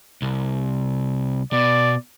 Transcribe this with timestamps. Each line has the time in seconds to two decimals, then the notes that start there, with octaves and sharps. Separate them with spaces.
0.22 C2
1.53 B2 D5